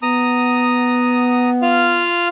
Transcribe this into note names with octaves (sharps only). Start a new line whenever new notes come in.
B3 A#5 D#6
F4 F5